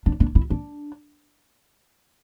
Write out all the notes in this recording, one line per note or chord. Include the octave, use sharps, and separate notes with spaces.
D4
D4
E4
D4